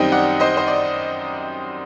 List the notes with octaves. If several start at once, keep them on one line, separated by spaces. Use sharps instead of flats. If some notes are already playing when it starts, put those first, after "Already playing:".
Already playing: F#2 D#3 G3 C4 D#4 D#5 G5
D5 F#5
C5 D#5
C5
D5